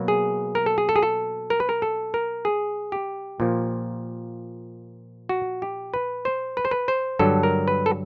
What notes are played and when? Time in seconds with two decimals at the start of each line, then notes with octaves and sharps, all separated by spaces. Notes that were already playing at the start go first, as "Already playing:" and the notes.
Already playing: B2 F#3 A#3
0.08 G#4
0.55 A#4
0.66 A4
0.78 G#4
0.89 A4
0.96 G#4
1.03 A4
1.50 A#4
1.60 B4
1.69 A#4
1.82 A4
2.14 A#4
2.45 G#4
2.92 G4
3.40 A#2 F3 A#3
5.29 F#4
5.62 G4
5.94 B4
6.25 C5
6.57 B4
6.65 C5
6.71 B4
6.88 C5
7.19 G2 D3 F#3 A4
7.43 A#4
7.68 B4
7.86 A4